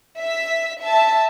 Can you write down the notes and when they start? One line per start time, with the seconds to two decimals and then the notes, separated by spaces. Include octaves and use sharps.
0.18 E5 B6
0.80 E5 A5